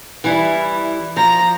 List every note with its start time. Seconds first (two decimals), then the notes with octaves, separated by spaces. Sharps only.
0.24 E3 G3 E4
1.16 F3 A#5